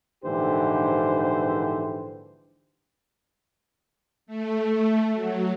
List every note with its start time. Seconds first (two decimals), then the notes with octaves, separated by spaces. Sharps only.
0.24 A#1 G#2 D3 E3 G4 C5
4.27 A3
5.14 F#3